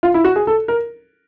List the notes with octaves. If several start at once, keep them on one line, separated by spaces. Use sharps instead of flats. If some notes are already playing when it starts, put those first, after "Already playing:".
F4
E4
F#4
G#4
A4
A#4